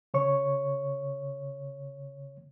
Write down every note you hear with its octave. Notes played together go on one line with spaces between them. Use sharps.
C#3 C#5 C#6